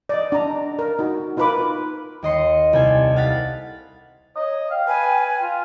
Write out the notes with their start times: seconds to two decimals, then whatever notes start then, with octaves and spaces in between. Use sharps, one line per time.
0.09 D5 D#5
0.32 D4 A#5
0.79 A#4
0.99 D#4 F#4
1.37 D#4 F4 A#4 B4 B5 D6
2.22 D#2 D#5 C6 C#7
2.73 C2 A4 G#5
3.16 F5 F#5 F#6 A6 B6
4.36 C#5 D#5
4.71 F5 G5
4.88 B4 G#5
5.41 F4